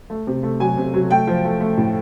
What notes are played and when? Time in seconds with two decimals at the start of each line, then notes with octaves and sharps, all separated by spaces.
0.10 A3
0.27 C3
0.43 A3
0.60 F#3 G#5
0.77 C3
0.94 F#3
1.11 A3 G5
1.27 F3
1.44 A3
1.60 A3
1.77 A2